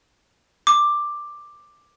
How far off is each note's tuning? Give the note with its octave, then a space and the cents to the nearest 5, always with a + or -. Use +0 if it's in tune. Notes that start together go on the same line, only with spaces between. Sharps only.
D6 +10